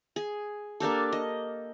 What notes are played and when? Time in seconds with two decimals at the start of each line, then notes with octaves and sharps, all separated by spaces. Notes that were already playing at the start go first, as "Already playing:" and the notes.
0.16 G#4
0.80 A#3 D4 G4 A4
1.13 D#5